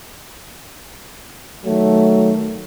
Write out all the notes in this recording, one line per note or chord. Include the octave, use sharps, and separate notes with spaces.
D#3 F#3 A3